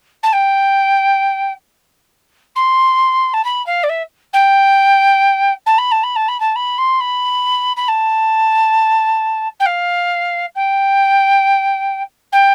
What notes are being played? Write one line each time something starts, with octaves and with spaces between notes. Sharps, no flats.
A5
G5
C6
A5
B5
F5
D5
E5
G5
A5
B5
A5
B5
A5
B5
A5
B5
C6
B5
B5
A5
G5
F5
G5
G5